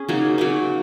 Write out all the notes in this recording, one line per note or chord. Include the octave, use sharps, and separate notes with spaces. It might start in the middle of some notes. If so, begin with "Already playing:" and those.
Already playing: C#4 G#4
C#3 F#3 A#3 D#4
C#3 F#3 A#3 D#4